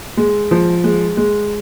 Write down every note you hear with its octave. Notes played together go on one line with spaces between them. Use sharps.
G#3
F3
G#3
G#3